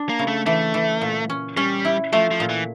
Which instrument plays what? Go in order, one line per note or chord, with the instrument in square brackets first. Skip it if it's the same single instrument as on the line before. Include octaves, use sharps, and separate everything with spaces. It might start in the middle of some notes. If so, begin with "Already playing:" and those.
Already playing: [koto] D4
[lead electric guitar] A#3
[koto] C#3
[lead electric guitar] A3
[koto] E3 [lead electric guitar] A3
[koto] E3
A#2
C#4
[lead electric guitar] G3 [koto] C#4
[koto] E4
[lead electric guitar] F3 [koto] A3
[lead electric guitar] F3
[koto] A#2
[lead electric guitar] E3